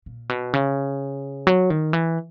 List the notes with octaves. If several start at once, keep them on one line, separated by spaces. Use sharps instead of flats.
A#2
B2
C#3
F#3
D#3
E3